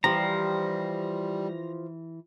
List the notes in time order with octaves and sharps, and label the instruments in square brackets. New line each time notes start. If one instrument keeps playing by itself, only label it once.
[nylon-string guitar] E3 G4 [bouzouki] F3 [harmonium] G3 [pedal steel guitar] A#5